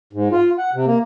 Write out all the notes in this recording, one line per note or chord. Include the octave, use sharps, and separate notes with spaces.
G#2
F4
F#5
C3
A#3